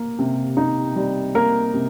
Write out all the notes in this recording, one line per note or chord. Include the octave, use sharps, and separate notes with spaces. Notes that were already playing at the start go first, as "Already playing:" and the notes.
Already playing: A#3
C3
D#4
G3
A#3 A#4
C3